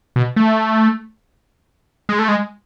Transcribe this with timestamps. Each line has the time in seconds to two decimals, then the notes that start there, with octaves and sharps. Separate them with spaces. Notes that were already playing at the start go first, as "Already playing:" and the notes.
0.16 B2
0.36 A3
2.09 G#3
2.19 A3
2.28 G#3